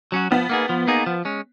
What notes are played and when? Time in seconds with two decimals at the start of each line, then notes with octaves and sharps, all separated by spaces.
0.12 F#3 C#4 F#4
0.31 F3 B3
0.49 A#3 D#4 G#4
0.69 F3
0.88 A#3 D#4 G#4
1.06 F3
1.25 G#3 C#4